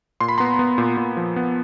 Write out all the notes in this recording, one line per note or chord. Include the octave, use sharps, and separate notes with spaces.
A#2 C6
B5
B3 A#5 C6
B3
A#2
A#2
F3
B3